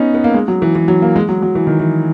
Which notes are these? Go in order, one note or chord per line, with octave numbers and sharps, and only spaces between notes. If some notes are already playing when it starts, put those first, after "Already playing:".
Already playing: B3 C#4 D#4
B3
A#3
G#3
F#3
E3
E3
F#3
A#3
G#3
F#3
F#3
E3
D#3
E3